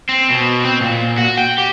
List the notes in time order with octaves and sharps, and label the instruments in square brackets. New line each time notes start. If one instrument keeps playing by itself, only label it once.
[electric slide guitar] C4
B2
C4
A#2
F#4
G5
G4